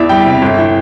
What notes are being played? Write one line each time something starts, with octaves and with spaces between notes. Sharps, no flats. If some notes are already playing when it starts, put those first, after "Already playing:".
Already playing: E2 E3 D5 E5
G3 G5
C3
G1
E3